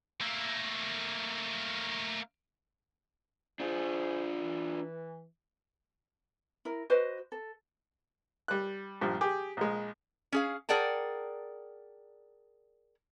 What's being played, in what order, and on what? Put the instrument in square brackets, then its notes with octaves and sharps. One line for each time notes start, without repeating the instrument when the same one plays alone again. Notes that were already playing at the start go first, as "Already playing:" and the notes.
[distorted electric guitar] A3 A#3
[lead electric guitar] D4 F4 [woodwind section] G#4 C5
[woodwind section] E3
[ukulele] E4 A#4
F#4 B4 C5 D#5
A4
[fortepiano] G3 F#6
A#1 G2 F3
G4 G#4
A#1 G#3
[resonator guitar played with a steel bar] C#4 G#4 F5
G#4 A#4 D5 F#5 G5 A5